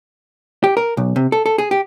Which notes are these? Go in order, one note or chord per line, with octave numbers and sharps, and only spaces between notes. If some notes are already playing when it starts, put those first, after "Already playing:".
G4
A#4
B1
C3
A4
A4
G#4
G4